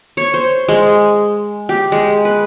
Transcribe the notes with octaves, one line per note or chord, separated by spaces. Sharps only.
C#5
C5
G#3
G4
G#3
B4